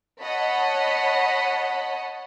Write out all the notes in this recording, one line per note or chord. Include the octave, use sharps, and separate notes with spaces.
C#5 D#5 F#5 A5 B5 B6